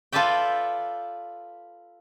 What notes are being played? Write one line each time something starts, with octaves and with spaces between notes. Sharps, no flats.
F4 A4 B4 D5 E5 G5